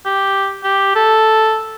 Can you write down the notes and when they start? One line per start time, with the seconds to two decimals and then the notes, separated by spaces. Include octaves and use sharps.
0.06 G4
0.64 G4
0.96 A4